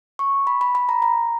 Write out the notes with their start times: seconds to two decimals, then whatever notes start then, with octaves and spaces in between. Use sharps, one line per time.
0.19 C#6
0.47 B5
0.61 B5
0.75 B5
0.89 A#5
1.02 A#5